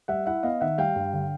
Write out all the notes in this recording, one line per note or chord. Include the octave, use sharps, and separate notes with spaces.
G3 E5 F#5
E4 E5 F#5
B3 D#5 F5
D#3 E5 F#5
G3 F5 G5
G2
D3